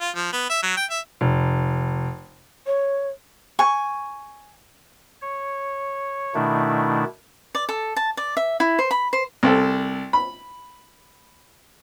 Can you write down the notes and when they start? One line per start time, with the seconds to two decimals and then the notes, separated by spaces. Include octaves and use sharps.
0.01 F4
0.15 F3
0.33 B3
0.50 E5
0.63 F#3
0.77 G5
0.90 E5
1.21 F1
2.66 C#5
3.59 G#5 C#6
5.22 C#5
6.35 B2 D#3 A3 D4 E4
7.55 D5
7.69 A4
7.96 A5
8.17 D5
8.37 E5
8.60 E4
8.79 C5
8.91 B5
9.13 C5
9.43 C2 A4
10.13 B5